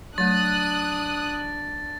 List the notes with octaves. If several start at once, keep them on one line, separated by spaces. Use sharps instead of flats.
F#3 A3 D4 D#6 F#6 A6